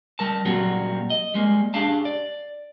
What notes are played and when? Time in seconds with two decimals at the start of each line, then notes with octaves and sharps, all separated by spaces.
0.19 G3 A#4 A5
0.45 A#2 F#3 G3 A#3 C4 F#4
1.10 D#5
1.34 G3 G#3 A#3
1.74 D4 G4 G#4 F5 A5
2.05 D5